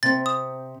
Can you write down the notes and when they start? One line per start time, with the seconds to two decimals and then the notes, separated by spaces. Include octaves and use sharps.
0.03 C3 C4 A6
0.26 D#6